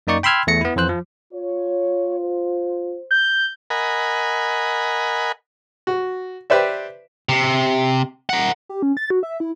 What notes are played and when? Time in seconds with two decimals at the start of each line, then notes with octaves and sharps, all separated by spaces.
0.07 F#2 A#3 D#4 D5 C#6
0.23 G5 B5 C6 E6 F6 G#6
0.47 E2 A3 A#6 C#7
0.61 B3 E4
0.76 F2 E3 C5 F#6
0.89 F3
1.33 F4 C#5
2.18 C5
3.11 G6
3.70 A#4 D#5 F#5 G#5 B5
5.87 F#4
6.50 G4 B4 C5 D5 E5
7.29 C3
8.29 A#4 F#5
8.69 G4
8.83 C#4
8.97 A6
9.10 F#4
9.23 E5
9.40 E4